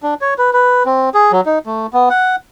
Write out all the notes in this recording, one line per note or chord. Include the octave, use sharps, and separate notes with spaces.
D4
C#5
B4
B4
C4
G#4
F#3
D#4
A3
B3
F#5